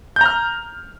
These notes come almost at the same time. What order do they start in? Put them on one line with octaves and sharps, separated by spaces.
G6 A#5 F6